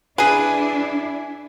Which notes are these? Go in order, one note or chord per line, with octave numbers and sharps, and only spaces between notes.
D4 E4 G#4 B4 G#5